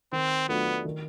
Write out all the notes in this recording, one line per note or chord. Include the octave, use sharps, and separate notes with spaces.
D#3 C4
F#3 A3 B3 D4 F4
D#3